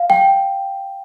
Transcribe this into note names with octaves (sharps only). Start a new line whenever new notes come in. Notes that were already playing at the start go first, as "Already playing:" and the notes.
Already playing: F5
G5